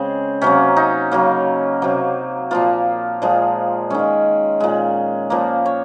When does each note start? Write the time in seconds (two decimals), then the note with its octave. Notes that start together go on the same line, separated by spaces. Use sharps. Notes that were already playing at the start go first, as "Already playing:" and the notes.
Already playing: C#3 G#3 C4
0.42 C3 F#3 A#3 C#4
0.77 D#4
1.12 C#3 F#3 A#3
1.82 C3 F#3 A#3
2.51 A#2 F3 A#3 F4
3.22 A#2 F3 G#3
3.90 D#3 G#3 C#4
4.60 A#2 G#3
5.30 A#2 F3 A#3
5.66 C#5